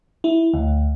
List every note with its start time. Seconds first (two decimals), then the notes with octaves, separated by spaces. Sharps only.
0.24 E4
0.54 D2